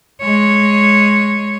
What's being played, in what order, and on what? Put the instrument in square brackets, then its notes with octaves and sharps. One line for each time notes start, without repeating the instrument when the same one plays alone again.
[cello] G#3 C#5